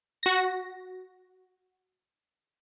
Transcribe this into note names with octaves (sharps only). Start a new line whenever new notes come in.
F#4 A#6